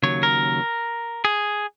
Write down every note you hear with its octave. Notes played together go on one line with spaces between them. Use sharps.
D#2 C#3 F#3 C#5
A#4
G#4